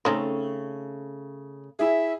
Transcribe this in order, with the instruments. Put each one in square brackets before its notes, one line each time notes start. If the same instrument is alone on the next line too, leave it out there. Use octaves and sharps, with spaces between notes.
[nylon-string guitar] C#3 A3 A4 [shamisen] C4 C#4 D#4
[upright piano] E4 G#4 [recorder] E5